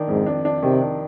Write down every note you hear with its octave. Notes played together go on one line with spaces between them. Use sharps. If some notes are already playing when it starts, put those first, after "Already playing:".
Already playing: D#3 D4
F2 G#2
D4
D4
C3 D#3
D4